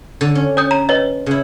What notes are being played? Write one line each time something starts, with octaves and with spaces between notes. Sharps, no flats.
D3
C#4
C#5 D#6 G6
A#5
B4 C#5 D#5
C#3 E4